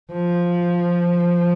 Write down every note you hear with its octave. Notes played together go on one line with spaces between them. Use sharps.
F3